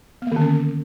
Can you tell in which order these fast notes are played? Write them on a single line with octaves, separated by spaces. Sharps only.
B3 A#3 D#3 D3 C#4